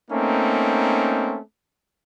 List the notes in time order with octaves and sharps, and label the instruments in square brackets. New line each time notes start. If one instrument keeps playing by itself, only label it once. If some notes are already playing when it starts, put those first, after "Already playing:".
[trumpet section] A3 A#3 C4 C#4 D#4